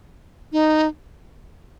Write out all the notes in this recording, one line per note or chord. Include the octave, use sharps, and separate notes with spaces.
D#4